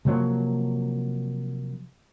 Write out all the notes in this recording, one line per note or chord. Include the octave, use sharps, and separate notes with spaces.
C3 F3 F#3 A#3